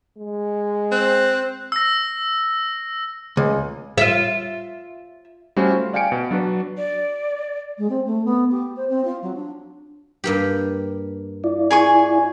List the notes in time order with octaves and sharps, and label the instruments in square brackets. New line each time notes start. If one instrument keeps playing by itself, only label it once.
[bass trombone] G#3
[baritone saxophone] C4 [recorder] F#6
[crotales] E6 A#6
[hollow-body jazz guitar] C#2
[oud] F4 E5
[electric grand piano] G3 A3 C#4 F#4 C5
F4
D5 F5 G5 G#5 C#7 D7
B2
F#3 D4 F#4 B4 D5
[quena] D5
[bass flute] G#3
C4
A3
B3
G4
C5
C4
F4
F#3
D4
[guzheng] G2 A#3 G4
[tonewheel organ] E4 F4 D5
[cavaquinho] G#4 G#5 C#6